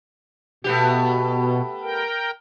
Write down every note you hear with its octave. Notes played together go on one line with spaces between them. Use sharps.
B2 A3 B3 G4
A#4 G5